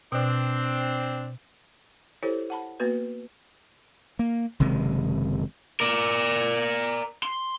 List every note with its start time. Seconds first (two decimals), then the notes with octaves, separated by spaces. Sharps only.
0.12 B2 C4 D4
2.23 E4 G4 A4 C5 C#5
2.50 F#5 A5 B5
2.80 A#3 B3 F#4 B4
4.19 A#3
4.60 F#1 C3 D#3 G#3
5.80 A#4 D5
7.23 C6